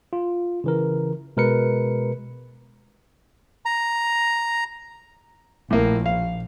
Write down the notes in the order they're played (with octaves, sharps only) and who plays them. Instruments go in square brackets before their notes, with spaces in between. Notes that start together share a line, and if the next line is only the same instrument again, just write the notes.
[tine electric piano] F4
C#3 E3 A#4
B2 G#3 A#4 B4 C#7
[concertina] A#5
[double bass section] A#1 [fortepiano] A2 A#3
[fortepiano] F5